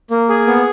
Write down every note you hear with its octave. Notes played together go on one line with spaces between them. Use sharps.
A#3
G#4
B3